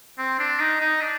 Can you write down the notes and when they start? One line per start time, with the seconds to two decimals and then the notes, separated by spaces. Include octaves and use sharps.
0.19 C4
0.39 D4
0.60 D#4
0.81 D#4
1.02 D4